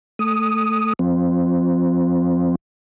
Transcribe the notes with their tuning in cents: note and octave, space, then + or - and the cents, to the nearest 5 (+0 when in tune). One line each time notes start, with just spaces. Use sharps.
A3 +0 D#6 +0
F3 +0 C4 +0